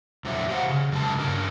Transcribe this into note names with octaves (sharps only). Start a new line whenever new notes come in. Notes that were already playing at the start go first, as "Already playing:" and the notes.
F2 A#2 F#3 E4 C#5 E5
G4 C5 F5 F#5
C#3
F#2 C#3 G#3 G4 A5
G2 C#3 A#4 A#5